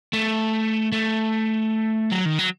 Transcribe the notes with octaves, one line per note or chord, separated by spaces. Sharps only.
A3
A3
F#3
D#3
F#3